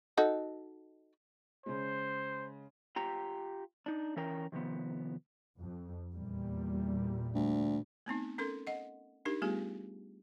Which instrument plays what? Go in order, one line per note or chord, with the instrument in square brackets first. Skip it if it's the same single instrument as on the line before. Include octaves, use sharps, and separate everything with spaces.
[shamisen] D#4 F#4 A4
[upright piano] C#3 G#3 [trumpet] C5
[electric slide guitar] F4 G4 G5 A#5
D4 D#4
E3 C#4 A#4 G5
C3 D#3 F3 B3
[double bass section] F2
E2 A#2 G3
[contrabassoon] D2
[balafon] A3 B3 C4 D#4
C#4 A4 A#4 C6
D#5 F#5
D4 D#4 G4 A#4
G3 A3 B3 F4 G4 G#4